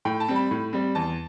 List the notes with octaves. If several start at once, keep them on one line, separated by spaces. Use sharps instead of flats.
A2 G5
A5
G3 C4
B5
A2
G3 C4
E2 A5